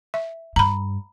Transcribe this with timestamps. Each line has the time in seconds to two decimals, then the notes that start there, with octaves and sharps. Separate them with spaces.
0.14 E5
0.56 G2 A#5 B5